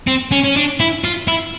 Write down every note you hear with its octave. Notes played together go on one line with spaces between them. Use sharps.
C4
C#4
C#4
D4
E4
F4
E4